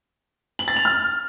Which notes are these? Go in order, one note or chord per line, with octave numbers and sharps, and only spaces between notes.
F#7
A6
F7
F6